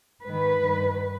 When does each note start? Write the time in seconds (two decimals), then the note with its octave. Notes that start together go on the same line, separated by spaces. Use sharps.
0.23 G#2 D#3 B4
0.62 G2 D#3